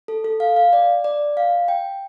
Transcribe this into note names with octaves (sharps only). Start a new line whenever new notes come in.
A4
A4
F5
F5
D5
D5
F5
G5